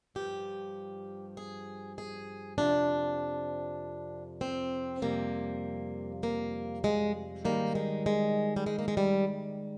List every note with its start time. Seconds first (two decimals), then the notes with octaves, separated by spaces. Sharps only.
0.15 G2 F3 G4
1.37 G#4
1.98 G#4
2.58 F2 C3 F3 D4
4.41 C4
5.02 F2 C3 G3 A#3
6.23 A#3
6.84 G#3
7.45 G#2 D#3 G3 A#3
7.75 G#3
8.06 G#3
8.56 G3
8.66 G#3
8.79 A#3
8.88 G#3
8.97 G3